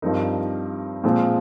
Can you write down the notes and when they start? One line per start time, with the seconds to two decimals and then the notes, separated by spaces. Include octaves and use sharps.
0.02 G2 F3 C4 D#4 A#4
1.04 A#2 F3 G#3 C4